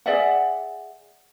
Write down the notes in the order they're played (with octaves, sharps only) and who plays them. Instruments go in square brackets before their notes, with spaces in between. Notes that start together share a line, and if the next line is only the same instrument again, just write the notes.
[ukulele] G#4 D5 E5 F#5